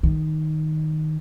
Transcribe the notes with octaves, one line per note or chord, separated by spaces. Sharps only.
D#3